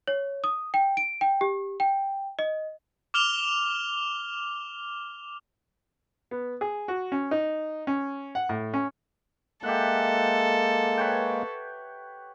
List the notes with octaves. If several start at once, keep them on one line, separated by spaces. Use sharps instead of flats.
C#5
D#6
G5
D7
G5
G4
G5
D#5
D6 F6 F7 G7
B3
G#4
F#4
C#4
D#4
C#4
F#5
A2
C#4
G#3 A#3 G4 A4 E5 F#5
B4 C#5 G5